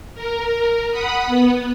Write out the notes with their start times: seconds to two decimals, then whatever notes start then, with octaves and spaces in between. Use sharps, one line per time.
0.14 A#4
0.91 F#5 B5 D#6
1.25 B3